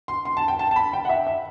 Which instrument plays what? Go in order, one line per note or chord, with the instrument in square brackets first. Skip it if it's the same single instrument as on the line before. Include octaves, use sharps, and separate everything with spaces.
[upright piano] C6
C6
A5
G5
A5
A5
B5
G5
F#5
E5
E5